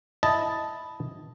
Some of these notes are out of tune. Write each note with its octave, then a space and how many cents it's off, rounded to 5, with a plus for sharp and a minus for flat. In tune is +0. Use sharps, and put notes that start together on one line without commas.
E4 +0 D#5 +0 A5 +0